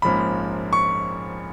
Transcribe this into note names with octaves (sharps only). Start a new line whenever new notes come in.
A#1 G#2 F3 A#3 C#4 B5
C#6